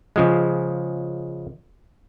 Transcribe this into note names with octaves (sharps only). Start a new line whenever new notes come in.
C#3 F3 G#3